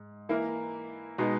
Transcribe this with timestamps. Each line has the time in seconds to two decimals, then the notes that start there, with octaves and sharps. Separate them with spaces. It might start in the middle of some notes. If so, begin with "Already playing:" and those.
Already playing: G#2
0.29 E3 A#3 E4 A#4
1.18 B2 G#3 B3 D#4